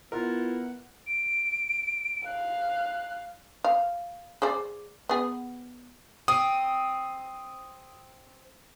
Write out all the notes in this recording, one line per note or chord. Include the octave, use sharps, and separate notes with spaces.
B3 E4 F4 A#4 F#5
D7
F5 F#6
F5
G#4 C5 D5
B3 G#4
C4 D#6